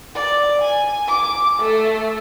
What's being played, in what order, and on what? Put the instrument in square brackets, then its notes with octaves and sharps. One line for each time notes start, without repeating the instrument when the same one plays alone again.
[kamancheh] D5
G#5
D6
A3